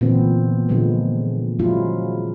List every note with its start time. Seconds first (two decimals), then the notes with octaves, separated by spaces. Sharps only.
0.01 A#2 D3 E3 B3 C4
0.69 A#2 D3 F3 G#3 B3
1.59 F3 F#3 G#3 C#4 E4 F4